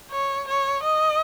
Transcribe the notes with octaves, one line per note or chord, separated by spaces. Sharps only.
C#5
C#5
D#5